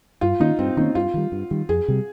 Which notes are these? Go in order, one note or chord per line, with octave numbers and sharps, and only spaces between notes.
G2 F4
D#3 A#3 C#4 D#4
G2 C4
D#3 A#3 C#4 D#4
G2 F4
D#3 G3
G2
D#3 G3
F2 G#4
C3 G3